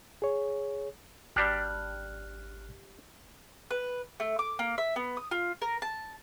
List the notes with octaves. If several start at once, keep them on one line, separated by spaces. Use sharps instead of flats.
G#4 C#5
G#1 G3 D4 G4 F6 F#6
B4
A3
D6
A#3
E5
B3
D#6
F4
A#4
A5